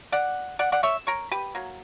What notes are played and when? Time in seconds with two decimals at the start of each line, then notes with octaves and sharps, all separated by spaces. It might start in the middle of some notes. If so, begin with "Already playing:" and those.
0.12 D5 F#5
0.59 D5 F#5
0.72 D5 F#5
0.83 C#5 E5
1.07 A#4 C#5
1.31 G4 B4
1.55 F#3 A#3